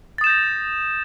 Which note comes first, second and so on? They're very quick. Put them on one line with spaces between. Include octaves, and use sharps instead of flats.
A6 D#6 E7 G6 A#6